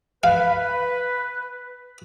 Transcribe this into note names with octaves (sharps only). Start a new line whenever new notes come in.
B4 F5